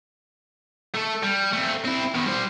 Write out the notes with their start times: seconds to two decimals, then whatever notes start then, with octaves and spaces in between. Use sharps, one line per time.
0.94 A3 A4
1.23 G3
1.53 A3 C4
1.85 C4 E4
2.15 D#3 B3
2.27 G3 C5